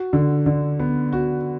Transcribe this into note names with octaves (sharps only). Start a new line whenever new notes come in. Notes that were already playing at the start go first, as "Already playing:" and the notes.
Already playing: F#4
D3
D3
B3
F#4